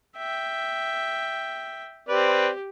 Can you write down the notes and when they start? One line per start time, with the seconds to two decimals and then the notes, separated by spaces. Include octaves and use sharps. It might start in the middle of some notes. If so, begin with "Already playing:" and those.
0.18 E5 G5
2.09 C4 G4 B4 D5